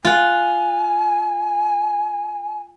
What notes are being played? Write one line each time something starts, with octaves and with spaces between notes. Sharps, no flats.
F4 F#5 G#5